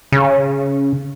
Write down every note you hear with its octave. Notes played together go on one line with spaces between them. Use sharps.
C#3